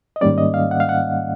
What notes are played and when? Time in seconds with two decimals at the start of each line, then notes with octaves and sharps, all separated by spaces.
0.16 D#5
0.21 G#2 D#3 G3 A#3 C#4 D5
0.38 D#5
0.54 F5
0.71 F#5
0.80 F5
0.89 F#5